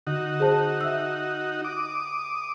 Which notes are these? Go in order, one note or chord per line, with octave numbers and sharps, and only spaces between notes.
D3 D#4 F#4
G#4 C5 A5
E5 E6
D6 D#6